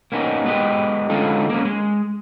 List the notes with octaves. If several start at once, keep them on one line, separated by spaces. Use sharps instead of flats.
A#3 B3 C#4 D#4
G#3 B3 D4 G4 D#5
D3 G#3 C#4 D#4 F4 A4
A#3 C#4
G#3